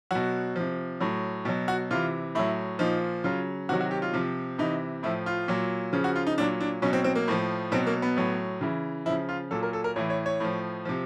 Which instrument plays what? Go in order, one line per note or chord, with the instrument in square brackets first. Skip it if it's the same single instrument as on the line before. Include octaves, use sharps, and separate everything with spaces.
[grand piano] B2 F#3 F#4
C3 F3
A2 F#3
B2 F#3
F#4
C3 E3 F4
A2 F#3 E4
A#2 F3 D#4
C#3 F#3 F4
C3 D#3 F#3 F#4
F#4
G4
F4
C3 F3
C3 E3 D#4
A2 F3 E4
F4
A#2 F#3
C#3 F3
F#4
F4
D#4
A#2 F#3 D4
D4
B2 F#3 C#4
C4
C4
A#3
A2 F3
B2 F#3 C4
A#3
B3
A2 F#3
C#3 E3
F3 E4
C#3
F4
A#2 F#3 A4
A#4
A4
A#4
A2 E3 C#5
C#5
C#5
A2 F3
C3 F3